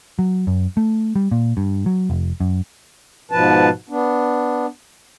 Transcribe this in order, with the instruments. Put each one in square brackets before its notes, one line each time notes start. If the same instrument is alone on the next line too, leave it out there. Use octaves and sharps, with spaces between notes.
[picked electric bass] F#3
F#2
A3
G3
A#2
G2
F#3
F1
F#2
[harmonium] G#2 B2 F3 B4 A5
B3 D4